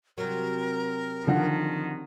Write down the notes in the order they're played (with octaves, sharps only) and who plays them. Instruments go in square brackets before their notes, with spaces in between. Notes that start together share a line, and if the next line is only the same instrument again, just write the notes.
[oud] C3 F#3 [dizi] A#4
[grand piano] D3 F3 F#5 [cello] D#3